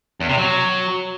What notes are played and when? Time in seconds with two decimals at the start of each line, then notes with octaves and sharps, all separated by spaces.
0.20 E2
0.29 C3
0.38 F#3